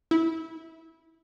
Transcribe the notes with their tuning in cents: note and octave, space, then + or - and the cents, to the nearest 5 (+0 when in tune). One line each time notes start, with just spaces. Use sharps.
E4 -20